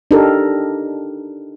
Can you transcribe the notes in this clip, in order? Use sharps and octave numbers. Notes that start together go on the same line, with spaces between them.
D4 D#4 G4 A4 A#4